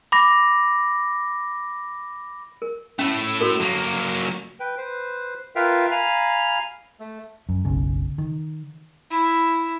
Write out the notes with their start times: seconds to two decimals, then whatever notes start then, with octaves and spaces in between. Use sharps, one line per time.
0.12 B5 D6 A#6
2.62 A#4
2.99 A3 C#4 E4
3.41 F#4 A4 A#4
3.60 F#3 A#3
4.60 B4 G5
4.78 B4 C5
5.55 F4 A#4 B4 E5 F5 G5
5.91 F5 G#5 A#5 B5
7.00 A3
7.49 F#2
7.65 F#1 B1 C#3
8.18 D#3
9.11 E4